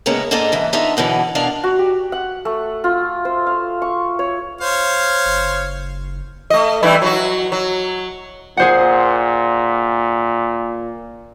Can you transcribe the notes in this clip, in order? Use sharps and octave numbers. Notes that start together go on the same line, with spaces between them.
A2 C#3 G#3 A#3 B3 C#4
G#2 A#3 D4 A4 D#5 G#5
D2 G#2 E3
B3 D4 D#4 F4 E5
F#2 B2 D3 E3
B2 D4 A#4 D5 F5
F#4
G4
F#5
A3
F4
C5
F5
C#6
C#5
C5 C#5 F5
F#1
A3 D#5
G2 E3 E4
F#3 F#4
F#3
A#2 G#4 C5 F#5